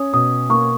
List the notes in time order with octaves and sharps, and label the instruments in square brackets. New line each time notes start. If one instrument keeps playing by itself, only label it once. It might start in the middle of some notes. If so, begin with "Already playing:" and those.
Already playing: [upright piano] C#4 [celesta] D#6
[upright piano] B2 [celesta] D#6
[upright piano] A#3 [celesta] C#6